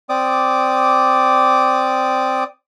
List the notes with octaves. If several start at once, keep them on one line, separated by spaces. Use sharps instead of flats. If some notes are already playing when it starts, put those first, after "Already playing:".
C4 D5 D6 D#6